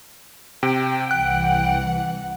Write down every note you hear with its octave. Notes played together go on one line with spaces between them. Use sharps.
C3 G5
C2 E3 F#5 F#6